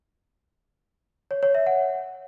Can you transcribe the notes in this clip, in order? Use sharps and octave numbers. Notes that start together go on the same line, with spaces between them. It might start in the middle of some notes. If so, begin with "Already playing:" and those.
C#5
C#5
E5
F#5